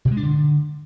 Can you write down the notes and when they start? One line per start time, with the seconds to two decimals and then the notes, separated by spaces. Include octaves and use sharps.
0.05 B2
0.11 G#3
0.17 D4
0.23 D3